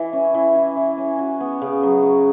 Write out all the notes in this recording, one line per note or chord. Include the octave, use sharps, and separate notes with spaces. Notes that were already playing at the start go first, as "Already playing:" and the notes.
Already playing: E3 E4
C#4
E3
E4
E3
C#4
F#4
B3
C#3
F#3
F#4